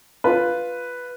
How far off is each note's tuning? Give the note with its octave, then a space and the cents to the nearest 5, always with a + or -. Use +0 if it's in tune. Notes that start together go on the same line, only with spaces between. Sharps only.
F4 +0 B4 +0